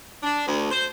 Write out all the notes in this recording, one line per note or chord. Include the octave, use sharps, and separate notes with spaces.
D4
D2
C5